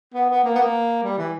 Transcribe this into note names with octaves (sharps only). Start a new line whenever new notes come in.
B3
B3
A#3
B3
A#3
G3
E3